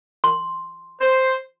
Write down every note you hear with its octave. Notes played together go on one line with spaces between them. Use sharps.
C6
C5